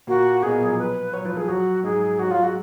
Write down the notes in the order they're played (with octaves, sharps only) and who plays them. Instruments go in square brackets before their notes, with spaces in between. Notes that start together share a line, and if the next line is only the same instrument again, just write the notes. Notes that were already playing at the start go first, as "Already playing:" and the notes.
[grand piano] A#2 A#3 [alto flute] F#4
[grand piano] B2 B3 [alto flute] G#4
[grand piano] A#2 A#3
F#3
F3
[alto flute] B4
[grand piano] F#3 [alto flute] C#5
[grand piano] F3 [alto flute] B4
[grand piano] F3 [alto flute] G#4
[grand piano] F#3 [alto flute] F#4
[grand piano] G#2 G#3 [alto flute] G#4
[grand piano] F#3 [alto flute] F#4
[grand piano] F#3 [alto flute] F4
[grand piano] G#3 [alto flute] F#4